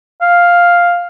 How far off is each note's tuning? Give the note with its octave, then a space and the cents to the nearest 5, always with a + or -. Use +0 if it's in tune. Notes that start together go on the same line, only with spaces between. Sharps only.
F5 +5